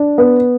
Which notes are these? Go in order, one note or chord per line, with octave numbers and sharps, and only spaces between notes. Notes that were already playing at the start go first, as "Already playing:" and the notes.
Already playing: D4 D5
B3